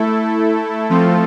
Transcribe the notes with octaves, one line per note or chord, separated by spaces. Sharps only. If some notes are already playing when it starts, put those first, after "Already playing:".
Already playing: A3 E4 A4
F3 A3 C4 F4 A4